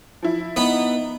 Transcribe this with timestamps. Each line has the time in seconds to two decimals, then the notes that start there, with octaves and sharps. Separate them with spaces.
0.23 F3 E4
0.56 B3 D#4